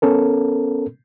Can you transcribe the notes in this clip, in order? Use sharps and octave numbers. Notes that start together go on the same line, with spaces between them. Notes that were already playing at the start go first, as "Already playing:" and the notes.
B3 C#4 A4 A#4